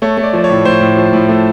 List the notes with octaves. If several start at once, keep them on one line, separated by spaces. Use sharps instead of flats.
A3 C#5
A3
D5
F3 D5
C#5
A2
A2 C5
A2
F3
A2
A3